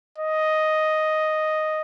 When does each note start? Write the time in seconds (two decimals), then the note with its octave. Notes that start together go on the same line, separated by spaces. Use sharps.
0.19 D#5